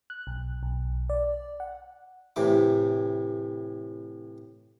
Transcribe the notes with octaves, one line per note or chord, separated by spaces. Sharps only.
F#6
B1
B1
D5
F#5
A2 C3 E3 D6